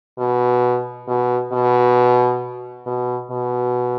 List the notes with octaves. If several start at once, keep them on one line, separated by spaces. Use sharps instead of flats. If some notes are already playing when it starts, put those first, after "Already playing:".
B2
B2
B2
B2
B2